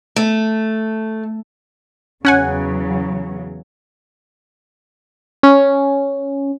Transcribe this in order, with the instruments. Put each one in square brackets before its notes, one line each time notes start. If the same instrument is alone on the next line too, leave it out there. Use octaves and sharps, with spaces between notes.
[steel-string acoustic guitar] A3
[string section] E2 C#3 F#3 [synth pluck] C#4 F#5 G#5
[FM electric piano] C#4